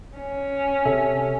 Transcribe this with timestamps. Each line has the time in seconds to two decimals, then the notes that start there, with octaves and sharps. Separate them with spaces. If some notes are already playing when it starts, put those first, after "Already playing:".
0.18 C#4
0.85 C3 A4 E5